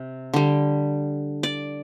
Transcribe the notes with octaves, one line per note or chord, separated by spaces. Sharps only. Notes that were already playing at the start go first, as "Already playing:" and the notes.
Already playing: C3
D3 G3
D5